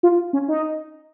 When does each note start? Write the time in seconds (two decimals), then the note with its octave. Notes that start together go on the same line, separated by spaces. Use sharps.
0.03 F4
0.33 C#4
0.48 D#4